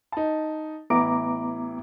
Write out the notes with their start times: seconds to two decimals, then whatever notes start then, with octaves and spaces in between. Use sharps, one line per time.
0.12 D#4 A5
0.90 A1 B3 E4 A#5 D6 D7